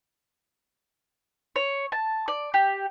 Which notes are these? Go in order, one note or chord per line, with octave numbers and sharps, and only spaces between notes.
C#5
A5
D5
G4